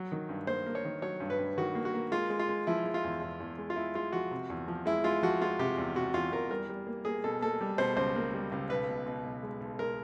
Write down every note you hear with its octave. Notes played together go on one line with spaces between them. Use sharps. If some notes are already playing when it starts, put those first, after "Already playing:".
Already playing: F#3
D#3
G2
A#3 C5
A#3
C#5
D#3
F#3 C#5
G2
B4
G2
D#3 F#4
A#3
F#4
A#3
G#3 F4
G#3
F4
G#3
F3 E4
G#3
F4
E2
E2
E2
G#3
F4
G#3 E4
G#3 F4
F3 F#4
C3
E2
F3
G#3 E4
G#3 F4
F3 F#4
G#3 F4
C3 G4
E2
C3 F#4
E2 F4
E2 A#4
G3 A#4
G3
A#3
A#3 G#4
B2 A4
A#3 A4
G3
B2 C5
C#2 C5
A#3
G3
C#2
B1 B4
B2
B2
B1
G#3
B1
G#3 A#4